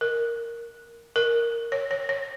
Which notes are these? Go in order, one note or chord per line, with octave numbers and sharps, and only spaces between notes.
A#4
A#4
C#5
C#5
C#5